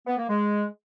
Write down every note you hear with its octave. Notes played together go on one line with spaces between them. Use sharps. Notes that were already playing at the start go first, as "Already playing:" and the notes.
B3
A#3
G#3